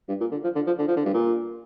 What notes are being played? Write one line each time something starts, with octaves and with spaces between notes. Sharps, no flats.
G2
A#2
D3
F3
D3
F3
D3
F3
D3
G2
A#2